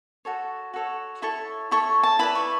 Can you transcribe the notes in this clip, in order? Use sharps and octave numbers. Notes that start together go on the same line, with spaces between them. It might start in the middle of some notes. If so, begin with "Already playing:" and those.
F#4 A4 C#5
F#4 A4 C#5
E4 A4 C#5 C#6
E4 A4 C#5 C#6
A5
E4 B4 D5 B5
C#6